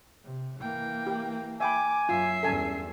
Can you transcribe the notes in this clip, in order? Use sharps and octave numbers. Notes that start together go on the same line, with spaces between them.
C3
E3 A#3 G5
G4
E5 G5 G#5 B5 D6
F#2 F4 E5 C7
E2 G2 C#4 A4 G#5 A5